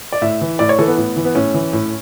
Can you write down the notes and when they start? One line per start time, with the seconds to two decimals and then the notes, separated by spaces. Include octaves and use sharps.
0.13 D5
0.22 A2 E5
0.41 E3
0.59 A2 D5
0.69 C#5
0.78 E3 A4
0.87 B3
0.97 A2
1.16 E3
1.24 B3
1.35 A2 C#4
1.54 E3
1.73 A2